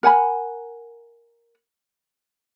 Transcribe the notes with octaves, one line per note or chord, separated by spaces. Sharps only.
A#4 F#5 G#5 B5